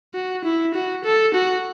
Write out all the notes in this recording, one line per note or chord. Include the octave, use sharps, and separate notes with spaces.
F#4
E4
F#4
A4
F#4